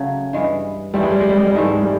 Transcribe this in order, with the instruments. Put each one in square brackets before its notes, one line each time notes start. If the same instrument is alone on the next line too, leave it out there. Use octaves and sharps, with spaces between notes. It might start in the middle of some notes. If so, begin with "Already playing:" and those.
Already playing: [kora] C#3 F#3 A3
G2 E3 G#3
[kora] E3 A3 C4 [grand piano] G3
[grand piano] G#3
G3
G#3
G3
G#3
G3
[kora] G#2 E3 A3 [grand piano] G#3
[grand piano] G3
G#3
G3